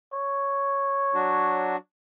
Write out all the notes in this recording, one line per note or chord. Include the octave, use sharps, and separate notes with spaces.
C#5
F#3 D4 F#4